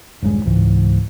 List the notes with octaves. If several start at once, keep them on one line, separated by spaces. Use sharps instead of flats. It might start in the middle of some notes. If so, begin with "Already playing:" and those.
D#1 A#1 G2 G#3
C#2 G#2 E3